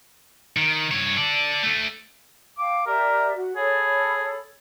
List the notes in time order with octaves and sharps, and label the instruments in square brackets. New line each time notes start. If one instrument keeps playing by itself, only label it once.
[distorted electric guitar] D#3
G2 C#5
A4 D5
D3 A3
[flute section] F5 G5 [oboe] D6
[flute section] G4 D5 E5 [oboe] A#4
[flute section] F#4
[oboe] G#4 [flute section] A4 C#5 B5